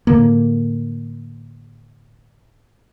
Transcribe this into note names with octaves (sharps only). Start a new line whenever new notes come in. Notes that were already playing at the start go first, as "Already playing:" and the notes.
A2 D3 A#3